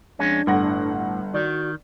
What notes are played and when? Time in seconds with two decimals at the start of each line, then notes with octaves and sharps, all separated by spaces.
0.19 F2 G#3 C#4 D4
0.47 G1 A2 F#5 A#6
1.34 D#3 F#4 D5